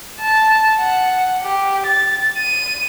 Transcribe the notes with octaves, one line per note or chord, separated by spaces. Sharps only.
A5
F#5
G4
A6
D#7